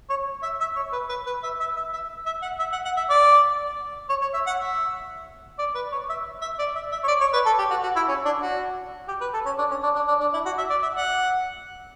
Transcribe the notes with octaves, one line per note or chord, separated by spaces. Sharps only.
C#5
E5
E5
C#5
B4
B4
B4
E5
E5
E5
E5
E5
F#5
E5
F#5
F#5
E5
D5
C#5
C#5
E5
F#5
E5
D5
B4
C#5
E5
E5
D5
E5
E5
C#5
D5
C#5
B4
A4
G4
F#4
F#4
E4
C#4
D4
F#4
G4
B4
A4
C#4
D4
C#4
D4
D4
D4
D4
E4
F#4
E5
D5
E5
F#5